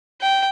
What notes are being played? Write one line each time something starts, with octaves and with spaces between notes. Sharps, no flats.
G5